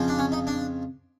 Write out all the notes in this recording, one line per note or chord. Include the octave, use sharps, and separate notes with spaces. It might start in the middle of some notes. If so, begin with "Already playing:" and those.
Already playing: F2 C#3 F3
D4
C#4
D#4
D4